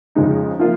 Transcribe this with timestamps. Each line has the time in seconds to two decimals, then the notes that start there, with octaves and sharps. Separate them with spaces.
0.15 F2 C#3 F3 G#3 D#4
0.59 F3 A#3 F4